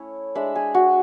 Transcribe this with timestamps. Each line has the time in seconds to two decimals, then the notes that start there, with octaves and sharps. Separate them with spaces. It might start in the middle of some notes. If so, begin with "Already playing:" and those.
Already playing: A3 C#4 E4
0.35 G#3 D4 E5
0.55 G#4
0.74 F#4